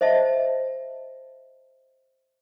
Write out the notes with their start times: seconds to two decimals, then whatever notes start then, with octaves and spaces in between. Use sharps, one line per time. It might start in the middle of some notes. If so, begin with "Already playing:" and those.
0.01 C5 D#5 E5 A5